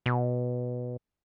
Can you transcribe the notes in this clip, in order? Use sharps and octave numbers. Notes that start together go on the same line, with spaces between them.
B2